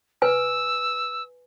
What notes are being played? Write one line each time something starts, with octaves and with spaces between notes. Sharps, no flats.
B4 G#5 E6